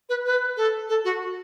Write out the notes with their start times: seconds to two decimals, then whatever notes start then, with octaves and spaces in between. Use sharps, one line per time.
0.09 B4
0.26 B4
0.57 A4
0.89 A4
1.05 F#4